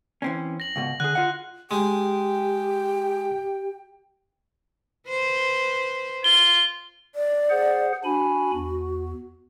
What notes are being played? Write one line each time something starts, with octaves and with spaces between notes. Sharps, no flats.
E3 C4 C#4
A#6 F#7
C#2 G#2 B2
D3 G#4 F#6
F4 D#5 F#5
G#3 G4 G5
B4 C5
F4 G7
D5
G#4 C5 F#5
D4 F#4 G#5 B5
E2